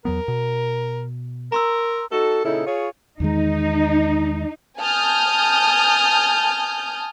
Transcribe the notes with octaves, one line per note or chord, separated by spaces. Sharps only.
E2 F#3 B3 A#4
B2
A#4 A#5 C6 E6
D#4 F#4 A4
A#2 C#3 D#4 E4 A4
F4 G#4 C#5
E2 D#3 G#3 D#4
G#5 A5 D#6 F6 G6